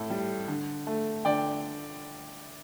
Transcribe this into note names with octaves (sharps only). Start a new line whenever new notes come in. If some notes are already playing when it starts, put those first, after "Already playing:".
Already playing: A2 A4
G3
D3
A3
D3 D5 G5